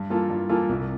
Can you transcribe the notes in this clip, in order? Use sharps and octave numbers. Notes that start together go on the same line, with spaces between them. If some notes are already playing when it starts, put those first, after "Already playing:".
Already playing: G2
E3 A#3 F4 A4
G2
E3 A#3 F4 A4
C2